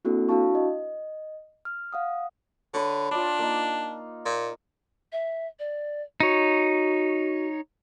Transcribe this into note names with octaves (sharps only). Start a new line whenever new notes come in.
A#3 C4 D4 E4 F#4 A4
D4 E4 F#4 F5 A5 C#6
D#5
F6
F5 F#5 D#6
D3 B4 C#5
D4 F4 D5
A#3 D#4
A#2
E5
D5
D#4 F#4 C#5